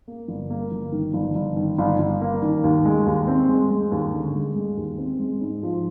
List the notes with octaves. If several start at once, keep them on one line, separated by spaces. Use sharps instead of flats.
A#3
G1
A#3
G1
D#3
G1
G1
D#3
G1
G1
A#3
D#3
D#2
G#3
D#2
C4
G#3
G#3
D#2
D3
G#3
G#3
D#2
C4
G#3
G#2
F3